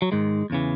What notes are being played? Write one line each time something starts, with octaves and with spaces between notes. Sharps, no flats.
F#3
G#2 D#3 G#3
E2 C#3 E3